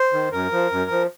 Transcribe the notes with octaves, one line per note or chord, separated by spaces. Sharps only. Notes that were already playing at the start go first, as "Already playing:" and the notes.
Already playing: C5
D#3
F#2 A#4
F3
F#2
F3